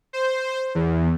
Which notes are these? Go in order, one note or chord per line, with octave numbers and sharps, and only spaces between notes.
C5
E2